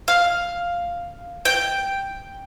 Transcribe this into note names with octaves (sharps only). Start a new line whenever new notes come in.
F5
G5